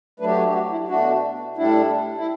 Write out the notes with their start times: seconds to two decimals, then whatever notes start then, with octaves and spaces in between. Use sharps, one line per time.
0.20 F#3 A3 D4 B4
0.28 G4
0.36 F#4
0.49 G4
0.54 F#4
0.71 E4
0.88 B2 A3 D4 F#4
1.57 A2 G3 D4 E4
2.17 E4